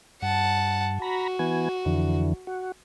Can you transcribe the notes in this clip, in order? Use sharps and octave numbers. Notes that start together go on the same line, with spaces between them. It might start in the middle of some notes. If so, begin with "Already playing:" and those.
G2 F#5 A5
F#4 A#5 B5
E3 B3 G#5
F2 D3 E3
F#4